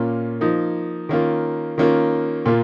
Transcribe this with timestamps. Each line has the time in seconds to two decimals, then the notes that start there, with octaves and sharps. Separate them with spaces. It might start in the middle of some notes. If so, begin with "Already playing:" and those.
Already playing: A#2 A#3 C#4 F4
0.41 F3 A#3 D#4
1.09 D#3 A#3 C#4 F4
1.78 D#3 A#3 C#4 F4
2.46 A#2 A#3 F4